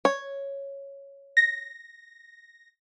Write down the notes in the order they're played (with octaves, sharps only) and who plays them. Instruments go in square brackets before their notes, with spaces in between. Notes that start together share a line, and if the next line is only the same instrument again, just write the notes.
[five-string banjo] C#5
[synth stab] A#6